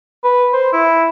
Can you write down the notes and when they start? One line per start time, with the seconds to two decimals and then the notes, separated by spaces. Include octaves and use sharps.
0.24 B4
0.53 C5
0.73 E4